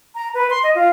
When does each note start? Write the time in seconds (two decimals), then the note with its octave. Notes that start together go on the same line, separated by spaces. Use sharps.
0.15 A#5
0.34 B4
0.50 C6
0.63 D#5
0.75 F4